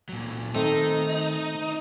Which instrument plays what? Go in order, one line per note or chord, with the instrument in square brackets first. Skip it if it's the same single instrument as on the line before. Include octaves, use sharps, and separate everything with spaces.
[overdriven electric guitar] A#2 F#3
[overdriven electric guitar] D#3 [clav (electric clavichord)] A3 C4 [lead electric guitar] D#4